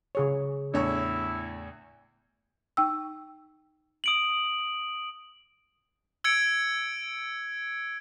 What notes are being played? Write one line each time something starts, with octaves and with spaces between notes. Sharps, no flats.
C#3 G#4 C#5
E2 A2 D4 E4 C#5
D#4 G5 E6
D#6 D7 F#7
E6 G#6 C#7 D7